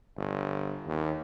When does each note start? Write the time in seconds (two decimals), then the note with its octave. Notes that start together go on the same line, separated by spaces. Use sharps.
0.17 G1
0.86 D#2